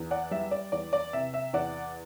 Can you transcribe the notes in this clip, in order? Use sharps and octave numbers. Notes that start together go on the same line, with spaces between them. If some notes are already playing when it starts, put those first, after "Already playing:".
Already playing: E2
D5 F#5
G3 E5
D5
E2 D5
D5
C3 E5
E5
E2 D5 F#5